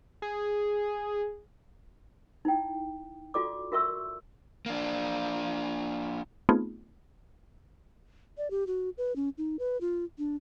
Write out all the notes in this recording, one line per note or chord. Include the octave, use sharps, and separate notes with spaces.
G#4
D#4 E4 G5
F4 F#4 A4 D5 D6
F#4 A#4 E5 C6 C#6 E6
A#3 D4
A3 B3 C4 D#4 F4 G#4
D5
G4
F#4
B4
C#4
D#4
B4
F4
D4